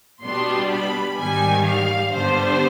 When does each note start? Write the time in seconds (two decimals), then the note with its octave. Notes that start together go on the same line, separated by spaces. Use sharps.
0.23 B2 G3 B3 D4 C6
0.71 B5
1.19 G#2 D#3 G3 G#5
1.66 F5
2.13 G2 D3 G3 B3 D4 C5